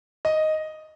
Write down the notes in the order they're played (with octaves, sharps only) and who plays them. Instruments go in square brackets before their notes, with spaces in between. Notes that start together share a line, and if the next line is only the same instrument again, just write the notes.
[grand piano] D#5